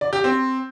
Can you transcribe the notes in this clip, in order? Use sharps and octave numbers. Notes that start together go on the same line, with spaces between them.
D5
G4
C4